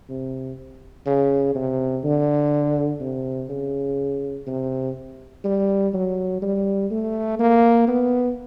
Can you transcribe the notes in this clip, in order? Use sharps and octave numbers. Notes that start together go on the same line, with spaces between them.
C3
C#3
C3
D3
C3
C#3
C3
G3
F#3
G3
A3
A#3
B3